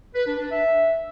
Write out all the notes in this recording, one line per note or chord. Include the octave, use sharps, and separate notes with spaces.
B4
D4
D4
E5